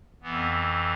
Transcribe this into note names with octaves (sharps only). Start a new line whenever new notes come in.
F2 E3 B3